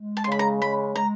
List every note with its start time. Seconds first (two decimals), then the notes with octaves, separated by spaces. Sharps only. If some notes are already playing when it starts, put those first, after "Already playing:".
Already playing: G#3
0.17 A5
0.24 C6
0.28 C#3 B5
0.39 A#5
0.62 G#3 B5
0.96 G#3 A#5